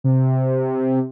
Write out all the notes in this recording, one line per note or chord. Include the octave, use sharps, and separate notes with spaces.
C3